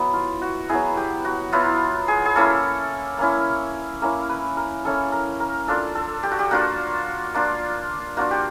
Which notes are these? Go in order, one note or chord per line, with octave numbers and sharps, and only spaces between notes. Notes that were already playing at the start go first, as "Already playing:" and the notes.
Already playing: F#3 B3 E4
F4
F#4
F#3 B3 E4 G#4
G4
F#4
F#3 B3 E4 F4
G#4
G#4
A#3 C#4 E4 A4
A#3 C#4 E4
A#3 C#4 E4 A#4
B4
A#4
A#3 C#4 E4 A4
A#4
A#4
A#3 D4 F4 A4
A4
G4
F#4
G4
A#3 D4 F4 F#4
A#3 D4 F4
A#3 D4 F4 F#4
G4